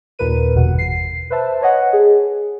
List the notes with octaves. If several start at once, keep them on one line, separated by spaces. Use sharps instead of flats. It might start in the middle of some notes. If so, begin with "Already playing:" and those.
D#2 A#2 A#4 B4 D#7
G1 E2 B2 F#5
C7
B4 C5 E5 A5
B4 C#5 D#5 F#5
G#4